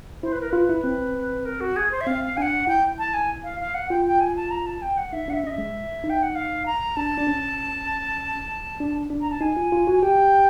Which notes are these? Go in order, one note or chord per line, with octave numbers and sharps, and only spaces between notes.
E4 C5
B4
A#4
F4 B4
E4
C4
A#4
F#4
G#4
C5
E5
C4 F5
D4 F#5 G#5
E4 G5
A5
G#5
F5
F5
F#5
F4 G5
G5
G#5
A5
A#5
A5
G5
F#5
D#4 E5
D4 F#5
E5
C#4 D#5
E5
G#3
D#4
G5
F#5
F5
A#5
D4 A5
D4
C#4
D4
D4
A#5
A5
D#4 G#5
F4
F4
F#4
G#5
G4 G5